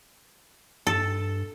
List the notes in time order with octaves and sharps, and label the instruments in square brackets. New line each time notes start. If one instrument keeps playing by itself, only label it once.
[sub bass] G2 [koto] A4